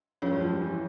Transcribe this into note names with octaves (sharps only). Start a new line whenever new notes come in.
F2 C#4 F4 G#4 C#5
G2
F3
G3
E3